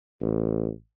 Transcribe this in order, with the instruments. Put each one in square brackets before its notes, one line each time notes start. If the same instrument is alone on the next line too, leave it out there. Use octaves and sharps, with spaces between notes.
[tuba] A1